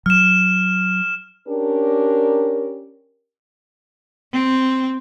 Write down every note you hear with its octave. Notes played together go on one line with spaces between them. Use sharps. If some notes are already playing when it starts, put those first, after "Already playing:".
F#3 F6 E7
C#4 D4 G4 A#4
C4